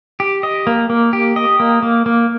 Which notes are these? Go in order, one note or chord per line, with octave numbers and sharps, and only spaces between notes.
G4
D#5
A#3
A#3
G4
D#5
A#3
A#3
A#3